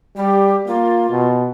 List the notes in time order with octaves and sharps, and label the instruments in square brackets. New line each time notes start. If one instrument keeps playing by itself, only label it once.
[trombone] G3 [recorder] G4
[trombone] A#3 [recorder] F4
[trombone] B2